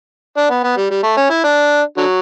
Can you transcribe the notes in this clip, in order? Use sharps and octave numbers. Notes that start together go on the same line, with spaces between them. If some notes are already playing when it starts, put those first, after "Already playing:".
D4
B3
B3
G3
G3
A3
C#4
E4
D4
D3 F#3